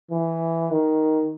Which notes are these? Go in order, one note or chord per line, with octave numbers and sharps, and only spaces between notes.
E3
D#3